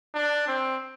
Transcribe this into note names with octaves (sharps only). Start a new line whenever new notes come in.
D4
C4